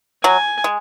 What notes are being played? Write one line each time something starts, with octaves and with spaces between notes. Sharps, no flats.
F#3 G#5
G#3